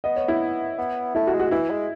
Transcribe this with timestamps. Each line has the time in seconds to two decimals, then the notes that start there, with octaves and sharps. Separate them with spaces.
0.04 B3 D#5
0.16 C#5
0.28 E4
0.78 B3
1.15 A3 E4
1.27 F#4
1.33 G#3
1.40 F#4
1.51 E3 E4
1.71 G#3